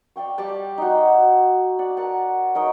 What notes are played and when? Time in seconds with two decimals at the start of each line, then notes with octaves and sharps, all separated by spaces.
0.16 D5 F5 G5 C#6
0.38 G3 G4 D5 A5
0.78 D#4 F#4
1.79 D5 F#5
1.97 A#4 F#5 A5
2.55 D#4 A#4 C#5 D#5